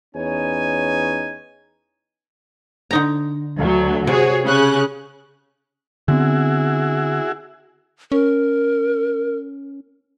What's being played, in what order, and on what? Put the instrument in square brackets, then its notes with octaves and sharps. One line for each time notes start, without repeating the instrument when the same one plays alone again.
[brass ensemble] E2 C#4 D#4 B4 C#5 G#5
[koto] D3 D#4 A#5
[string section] D2 F#3
[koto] C3 [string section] F#4 G#4 C#5
[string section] C#3 C#4 F#6
[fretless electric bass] D3 B3 C4 [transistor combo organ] E4 F#4 G#4
[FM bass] C#4 [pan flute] A#4